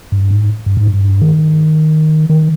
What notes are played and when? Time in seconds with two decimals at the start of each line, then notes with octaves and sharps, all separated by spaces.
0.12 G2
0.31 G#2
0.66 G2
0.77 G#2
0.87 G2
1.21 D#3
2.30 D#3